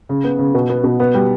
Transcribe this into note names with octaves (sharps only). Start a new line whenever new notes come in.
C#3
B3
C#3
B2
B3
B2
B3
G3